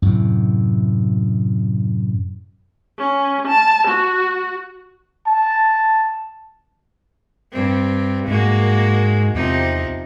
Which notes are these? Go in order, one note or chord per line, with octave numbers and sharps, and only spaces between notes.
F#2 A2 C3
C#4
A5
F#4
A5
G2 C4
G#2 G#3 A#3 F#4
E2 C3 F3 D#4